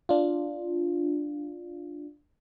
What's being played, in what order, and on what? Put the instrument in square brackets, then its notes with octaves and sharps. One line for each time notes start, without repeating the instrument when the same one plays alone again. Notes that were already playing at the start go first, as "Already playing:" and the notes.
[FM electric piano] D4 F4